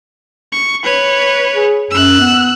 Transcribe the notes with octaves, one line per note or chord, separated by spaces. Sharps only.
C#6
B4 C#5
G#4
F#2 E6 F#6
B3